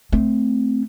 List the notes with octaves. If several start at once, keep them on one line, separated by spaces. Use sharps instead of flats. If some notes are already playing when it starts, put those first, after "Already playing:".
A3 C4